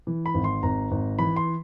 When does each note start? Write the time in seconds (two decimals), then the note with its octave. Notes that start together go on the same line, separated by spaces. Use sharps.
0.07 E3
0.26 B5
0.34 G#1
0.44 C6
0.63 G#1 A#5
0.91 G#1
1.19 E3 B5
1.36 C6